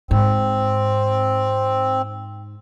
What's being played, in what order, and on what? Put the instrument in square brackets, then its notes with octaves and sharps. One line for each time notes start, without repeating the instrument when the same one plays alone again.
[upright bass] G#2 [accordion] C4